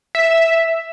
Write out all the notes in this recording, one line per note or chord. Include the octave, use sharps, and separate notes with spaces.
E5